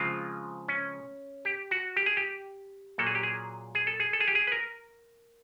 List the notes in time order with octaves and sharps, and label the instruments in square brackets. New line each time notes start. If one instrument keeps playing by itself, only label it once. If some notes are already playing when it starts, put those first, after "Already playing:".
Already playing: [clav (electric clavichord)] C#3 F3 G#3 C4 F4
C#4
G4
F#4
G4
G#4
G4
A#2 F#3 A#3 A4
G#4
G4
G#4
G#4
A4
G#4
A4
G#4
G4
G#4
B4
A#4